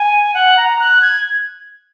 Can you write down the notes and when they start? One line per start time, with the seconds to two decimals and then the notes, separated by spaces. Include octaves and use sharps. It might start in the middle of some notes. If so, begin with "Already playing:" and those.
Already playing: G#5
0.34 F#5
0.57 A#5
0.79 F#6
1.02 G#6